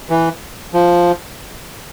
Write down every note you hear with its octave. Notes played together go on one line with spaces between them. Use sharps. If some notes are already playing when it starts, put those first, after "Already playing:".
E3
F3